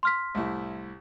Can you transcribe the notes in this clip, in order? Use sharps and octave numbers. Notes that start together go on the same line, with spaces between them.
C6 F6 B6
C2 A2 E4